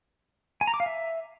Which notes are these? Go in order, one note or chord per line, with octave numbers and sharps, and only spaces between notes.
G#5
A#5
D6
F5
E5